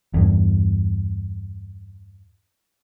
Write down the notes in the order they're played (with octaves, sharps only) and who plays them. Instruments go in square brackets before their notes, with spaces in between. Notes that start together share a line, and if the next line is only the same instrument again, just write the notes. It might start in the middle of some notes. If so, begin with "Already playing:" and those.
[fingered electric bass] E2 G2